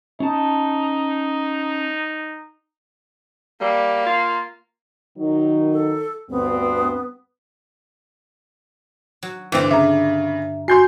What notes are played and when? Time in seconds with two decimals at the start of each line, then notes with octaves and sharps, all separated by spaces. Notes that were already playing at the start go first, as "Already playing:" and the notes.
0.20 C#4 D#4 A5
3.61 G3 A#3
4.06 F4
5.18 D#3 F#3 D#4
5.73 A4
6.30 D2 G2 B3 C4
9.23 F#3
9.52 G2 D3 E3 C4
9.71 C#3 E5 A#5
10.68 F#4 G#5 C6 G6 C7